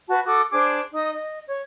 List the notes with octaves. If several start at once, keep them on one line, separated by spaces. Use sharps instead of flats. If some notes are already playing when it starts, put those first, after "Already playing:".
F#4 B4 A5
F#4 A4 D6 D#6
D4 G#4 C5 D6
D#4 D#5 D#6
D#5
C#5